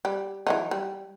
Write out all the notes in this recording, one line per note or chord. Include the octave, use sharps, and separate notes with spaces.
G3
E3 F#3 D#4
G3